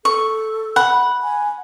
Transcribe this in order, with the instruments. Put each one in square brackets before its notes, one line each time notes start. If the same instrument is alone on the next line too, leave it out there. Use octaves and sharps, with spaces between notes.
[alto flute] A4 [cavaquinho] C#6
[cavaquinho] F#5 [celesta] B5
[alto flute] G#5